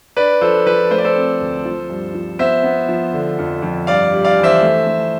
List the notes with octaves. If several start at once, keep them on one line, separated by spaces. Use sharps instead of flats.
D4 B4 D5
F3 A4 C5
F3 B4
A3 C5
D5
A4 C5
C4
D2
F3
G2
F3
B3 C5 E5
B3
F3
D3
F2
F2
G2 D5 F5
G3
D5 F5
E3
C5 E5
A3
A3